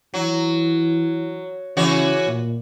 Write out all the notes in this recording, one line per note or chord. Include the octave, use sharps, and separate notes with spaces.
E3 F#3
C#3 E3 F#4 C#5
A#2